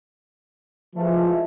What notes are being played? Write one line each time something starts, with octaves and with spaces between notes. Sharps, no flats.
E3 F3 G#3 A3